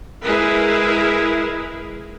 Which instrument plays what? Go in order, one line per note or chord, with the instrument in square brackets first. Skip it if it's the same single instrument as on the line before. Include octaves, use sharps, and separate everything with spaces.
[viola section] G#3 E4 G#4 A#4 B4